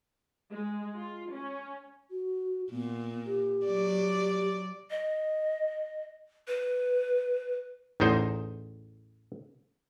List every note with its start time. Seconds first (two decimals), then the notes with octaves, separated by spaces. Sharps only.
0.51 G#3
0.96 F4
1.32 C#4
2.10 F#4
2.71 A#2 B3
3.26 G4
3.65 F#3 D5
4.90 D#5
6.48 B4
8.00 A1 E2 D#4 C5